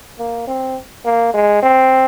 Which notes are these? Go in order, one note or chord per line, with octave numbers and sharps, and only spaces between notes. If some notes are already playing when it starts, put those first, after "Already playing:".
A#3
C4
A#3
G#3
C4